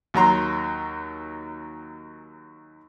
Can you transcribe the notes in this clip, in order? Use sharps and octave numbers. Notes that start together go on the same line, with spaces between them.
D#2 F#3 A#5 C6